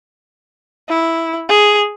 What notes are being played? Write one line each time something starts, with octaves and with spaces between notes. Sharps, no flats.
E4
G#4